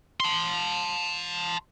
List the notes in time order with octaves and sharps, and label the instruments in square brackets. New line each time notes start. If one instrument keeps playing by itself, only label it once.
[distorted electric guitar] A5 C6